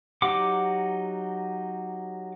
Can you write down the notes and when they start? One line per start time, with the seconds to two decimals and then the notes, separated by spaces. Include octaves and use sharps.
0.22 F#3 D#4 G4 F#5 D6